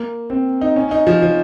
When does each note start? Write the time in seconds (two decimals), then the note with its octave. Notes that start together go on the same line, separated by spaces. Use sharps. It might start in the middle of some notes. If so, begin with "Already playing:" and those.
Already playing: A#3
0.30 C4
0.61 D#4
0.76 C#4
0.91 D#4
1.07 F3
1.22 F3